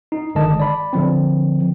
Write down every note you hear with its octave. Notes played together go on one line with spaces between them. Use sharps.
D#4
G1 D3 D#3 G#3 D#5 A5
D5 B5
D3 F3 C4